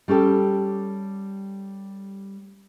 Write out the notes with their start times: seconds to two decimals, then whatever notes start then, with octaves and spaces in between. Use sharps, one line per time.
0.08 G3 C#4 G4 A4